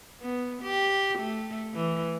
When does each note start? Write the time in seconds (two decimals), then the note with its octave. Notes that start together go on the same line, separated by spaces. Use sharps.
0.21 B3
0.63 G4
1.19 A3
1.74 E3